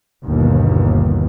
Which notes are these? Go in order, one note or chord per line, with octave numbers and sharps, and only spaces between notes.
G1 D#2 B2